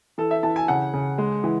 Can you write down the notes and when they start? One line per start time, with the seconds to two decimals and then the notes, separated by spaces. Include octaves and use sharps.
0.18 E3 A4
0.31 E5
0.43 E3 A5
0.56 G#5
0.68 C#3 F#5
0.93 C#3
1.18 G#3
1.44 E3